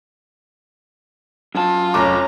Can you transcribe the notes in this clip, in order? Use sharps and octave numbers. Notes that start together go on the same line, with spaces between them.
F#2 F4 A5
F1 C#4 A#5 D6